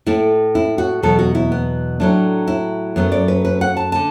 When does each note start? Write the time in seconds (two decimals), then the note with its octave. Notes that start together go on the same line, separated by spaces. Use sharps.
0.06 A2 A3 E4
0.55 E4
0.78 F#4
1.03 E2 B2 F#3 A4
1.19 F#4
1.35 E4
1.52 B3
2.00 A2 F#3 A3 D4
2.48 E4
2.96 F#2 F#3 A3 B3
3.12 D5
3.28 B4
3.45 B4
3.61 F#5
3.77 A5
3.92 D3 A5